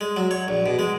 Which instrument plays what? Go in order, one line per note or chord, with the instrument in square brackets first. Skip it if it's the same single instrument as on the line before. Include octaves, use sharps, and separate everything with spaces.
[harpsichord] G#3
F#3
C#5
A#1
B2
G#3